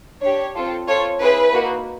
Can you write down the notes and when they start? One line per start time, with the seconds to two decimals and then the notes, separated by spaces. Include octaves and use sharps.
0.22 D4 G4 C#5
0.56 C4 F4 A4
0.88 C4 F4 A4 C#5
1.21 C4 E4 G#4 B4
1.53 A#3 D#4 F#4